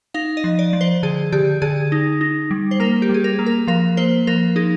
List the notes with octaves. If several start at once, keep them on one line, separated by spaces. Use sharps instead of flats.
D#4 F5
D#5
F3
D5
F3
C5
D3 G#4
D3 G4
D3 G#4
D#4
D#4
G3
C5
A#3 A#4
G4
G3
G#4
A#4
A#3
A#4
F3 A#4
A#3 C5
F3 A#4
D#4 G#4